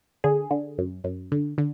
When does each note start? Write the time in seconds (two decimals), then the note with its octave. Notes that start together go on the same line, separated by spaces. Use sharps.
0.24 D3 G#4
0.51 D3
0.78 F#2
1.04 F#2
1.32 D3
1.58 D3